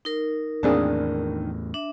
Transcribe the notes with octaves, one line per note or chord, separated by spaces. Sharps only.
D#4 A#4
E2 A2 D#3 A#3 C4 D4 G#4
D4 E5